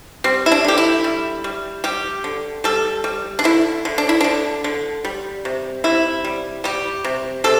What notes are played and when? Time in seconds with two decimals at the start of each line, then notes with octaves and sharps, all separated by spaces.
0.24 G3 C4
0.46 E4
0.52 D4
0.64 D3 G4
0.78 E4
1.04 G3
1.44 G3
1.84 G3 G4
2.24 D3
2.64 G3 A4
3.04 G3
3.39 D4
3.44 D3 E4
3.85 D3
3.98 D4
4.09 E4
4.21 D3 D4
4.64 D3
5.05 G3
5.45 C3
5.84 C3 E4
6.25 G3
6.64 G3 G4
7.04 C3
7.44 C3 A4